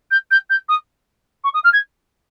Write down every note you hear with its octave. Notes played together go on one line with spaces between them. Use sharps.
G6
G6
G6
D#6
C#6
D#6
F6
G#6